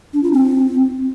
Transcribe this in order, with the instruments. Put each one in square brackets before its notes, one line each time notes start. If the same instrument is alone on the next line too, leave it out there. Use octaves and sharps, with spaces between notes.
[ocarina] D4
F4
C4